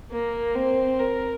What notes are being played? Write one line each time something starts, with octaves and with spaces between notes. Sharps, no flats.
A#3
C4
A#4